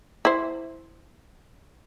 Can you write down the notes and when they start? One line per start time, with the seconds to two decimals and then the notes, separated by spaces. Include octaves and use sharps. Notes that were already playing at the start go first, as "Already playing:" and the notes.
0.25 E4 C5